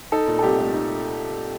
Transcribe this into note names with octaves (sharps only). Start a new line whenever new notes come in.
D#4 A4
A#2
A4
C2 G4
A3
D#4